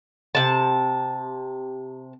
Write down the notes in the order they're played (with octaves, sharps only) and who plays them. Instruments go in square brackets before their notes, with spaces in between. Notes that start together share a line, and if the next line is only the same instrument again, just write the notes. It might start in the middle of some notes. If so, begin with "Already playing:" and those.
[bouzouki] C3 A5